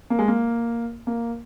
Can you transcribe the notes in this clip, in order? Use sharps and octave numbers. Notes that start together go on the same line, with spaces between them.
A#3
G#3
A#3
A#3